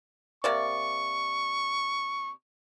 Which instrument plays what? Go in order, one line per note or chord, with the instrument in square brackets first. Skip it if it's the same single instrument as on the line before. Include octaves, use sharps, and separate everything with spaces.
[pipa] C3 A#3 D5 [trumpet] C#6